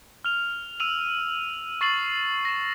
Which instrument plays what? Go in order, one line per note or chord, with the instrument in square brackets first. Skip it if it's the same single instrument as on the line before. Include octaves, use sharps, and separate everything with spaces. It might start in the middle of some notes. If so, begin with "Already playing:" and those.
[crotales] F6 F7
E6 D#7 F7 F#7
C#6 A6 C7 D#7 F#7
A#6 E7